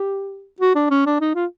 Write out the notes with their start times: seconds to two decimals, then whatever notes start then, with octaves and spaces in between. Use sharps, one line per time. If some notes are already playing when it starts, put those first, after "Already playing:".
Already playing: G4
0.61 F#4
0.76 D4
0.91 C#4
1.06 D4
1.21 D#4
1.35 F4